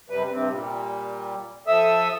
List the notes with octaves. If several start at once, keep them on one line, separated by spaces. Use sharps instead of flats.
F#2 C3 G3 B4
G2 C3 C4
A#2 G3
F3 A4 E5 D#6 E6